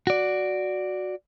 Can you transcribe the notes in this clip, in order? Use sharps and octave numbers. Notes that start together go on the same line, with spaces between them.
F#4 D5